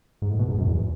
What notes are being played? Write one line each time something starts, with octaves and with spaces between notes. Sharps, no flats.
G#2
A2
B2
G#2
F#2
E2